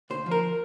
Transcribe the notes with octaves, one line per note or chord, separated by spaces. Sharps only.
D2 C5
F3
A#4